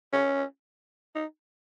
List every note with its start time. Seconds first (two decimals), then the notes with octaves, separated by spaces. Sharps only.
0.13 C#4
1.15 D#4